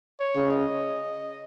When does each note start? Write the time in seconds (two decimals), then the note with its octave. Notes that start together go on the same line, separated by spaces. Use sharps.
0.20 C#5
0.35 C#3
0.51 D#5